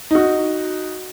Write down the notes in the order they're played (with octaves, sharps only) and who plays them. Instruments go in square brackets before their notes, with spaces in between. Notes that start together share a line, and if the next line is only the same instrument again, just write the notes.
[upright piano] D#4 F#4